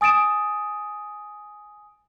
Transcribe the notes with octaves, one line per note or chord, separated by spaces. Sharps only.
G#5 D#6 A6 D7 E7